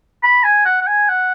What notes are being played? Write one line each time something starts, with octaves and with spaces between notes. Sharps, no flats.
B5
G#5
F#5
F#5
G#5
F#5